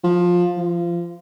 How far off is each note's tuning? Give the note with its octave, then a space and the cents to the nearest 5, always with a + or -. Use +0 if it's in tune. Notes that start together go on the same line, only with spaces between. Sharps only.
F3 +15
F3 -25